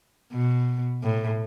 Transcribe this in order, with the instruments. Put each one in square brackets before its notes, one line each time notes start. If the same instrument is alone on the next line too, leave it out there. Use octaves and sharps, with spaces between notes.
[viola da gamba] B2
A2